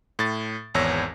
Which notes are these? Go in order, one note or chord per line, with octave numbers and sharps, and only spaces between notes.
A2 A6
G#1 E2 C#5 E6 A#6